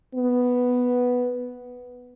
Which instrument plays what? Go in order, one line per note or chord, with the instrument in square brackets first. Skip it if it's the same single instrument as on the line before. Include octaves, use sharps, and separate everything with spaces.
[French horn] B3